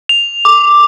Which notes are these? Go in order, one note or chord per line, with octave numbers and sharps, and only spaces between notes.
F7
D6